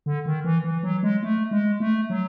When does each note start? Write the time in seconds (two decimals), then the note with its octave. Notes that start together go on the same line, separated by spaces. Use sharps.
0.06 D3
0.26 D#3
0.45 E3
0.64 E3
0.83 F#3
1.03 G#3
1.23 A3
1.51 G#3
1.80 A3
2.10 F#3